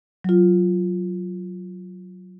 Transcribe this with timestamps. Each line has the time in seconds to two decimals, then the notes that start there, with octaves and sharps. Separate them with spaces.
0.24 F#3 F4